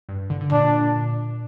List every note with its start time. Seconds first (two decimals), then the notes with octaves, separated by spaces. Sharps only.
0.09 G2
0.30 D3
0.41 D3
0.52 A#2 D4